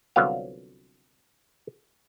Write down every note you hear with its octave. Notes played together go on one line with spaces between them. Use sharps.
C2 D3 F#3 B3 F4 F5